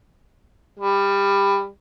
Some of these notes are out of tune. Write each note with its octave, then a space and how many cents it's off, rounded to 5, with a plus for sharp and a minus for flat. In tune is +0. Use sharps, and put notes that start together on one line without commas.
G3 +20